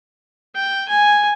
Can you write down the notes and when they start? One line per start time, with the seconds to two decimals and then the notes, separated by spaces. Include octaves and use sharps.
0.55 G5
0.88 G#5